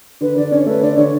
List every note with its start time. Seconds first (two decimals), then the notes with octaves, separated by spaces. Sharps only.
0.21 D3 B4
0.36 D3 D5
0.52 C#4 C#5
0.66 A3 B4
0.82 D3 D5
0.97 D3 C#5